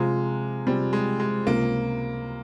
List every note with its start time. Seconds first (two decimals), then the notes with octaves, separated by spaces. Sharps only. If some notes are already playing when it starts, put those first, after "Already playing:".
Already playing: C3 F3 G#3 C4 F4
0.66 C3 F3 G3 C4 F4
0.93 G#3
1.20 G#3
1.47 C#2 C3 F3 A#3 C4